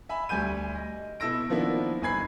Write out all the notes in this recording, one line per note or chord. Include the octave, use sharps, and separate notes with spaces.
E5 G#5 B5
D2 G3 G#5 G6 D#7
D#5
B2 E4 A4 E6 A#6 D7
D#3 F3 A#3 B3 D4 E4
G1 D#4 G#5 B5 G#6 C7